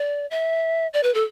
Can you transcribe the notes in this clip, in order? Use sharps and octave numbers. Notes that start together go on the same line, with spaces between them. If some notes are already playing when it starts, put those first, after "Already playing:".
Already playing: D5
E5
D5
B4
A4